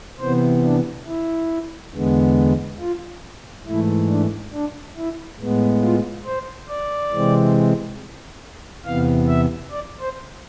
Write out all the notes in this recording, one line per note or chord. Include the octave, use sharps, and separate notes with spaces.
C3 E3 B3 C5
D4
E4
E2 D3 G#3 B3
F4
G#2 E3 A3 E4
D4
D4
E4
A2 G#3 B3
F4
C5
D5
C3 E3 G#3 C4
E2 C3 E3 B3 F5
E5
D5
C5